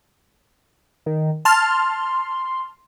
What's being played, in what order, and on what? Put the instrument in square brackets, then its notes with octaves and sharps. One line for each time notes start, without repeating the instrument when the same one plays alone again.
[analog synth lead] D#3
[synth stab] A5 F6 [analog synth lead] C6